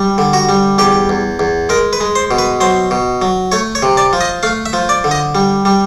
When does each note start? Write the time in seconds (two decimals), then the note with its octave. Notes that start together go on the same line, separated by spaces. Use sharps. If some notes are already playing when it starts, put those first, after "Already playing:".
Already playing: G3
0.18 D3
0.33 F#4
0.49 G3
0.78 E2 G4
1.09 E2
1.39 E2
1.69 G#3 A#4
1.93 B4
2.01 G#3
2.16 C5
2.31 B2
2.38 B4
2.60 F#3 C5
2.91 B2
3.22 F#3
3.52 A3 C#5
3.75 C#5
3.83 C3
3.97 D5
4.13 F3
4.21 D#5
4.43 A3 F5
4.66 E5
4.73 F3
4.89 D5
5.04 D3
5.11 D#5
5.35 G3
5.65 G3